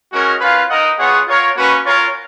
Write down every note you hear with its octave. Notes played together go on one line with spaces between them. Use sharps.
G#3 C#4 F#4 A#4 C#5
C#4 F4 B4 F5
D#4 A#4 D#5 F#5
B3 F4 G#4 C#5 F#5
F4 A#4 C#5 F5
A#3 C#4 F#4 B4
F4 A#4 C#5 F5